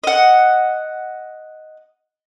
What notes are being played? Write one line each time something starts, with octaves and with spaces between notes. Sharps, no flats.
D#5 F#5